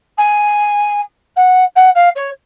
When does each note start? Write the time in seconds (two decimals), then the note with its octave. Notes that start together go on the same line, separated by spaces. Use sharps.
0.17 G#5
1.36 F#5
1.75 F#5
1.95 F5
2.15 C#5